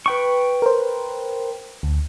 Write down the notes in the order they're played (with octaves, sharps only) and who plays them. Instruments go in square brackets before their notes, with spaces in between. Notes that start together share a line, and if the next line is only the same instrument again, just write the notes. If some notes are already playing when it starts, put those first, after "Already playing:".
[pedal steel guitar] B4 G5 C#6
[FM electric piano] A#4 C5
D2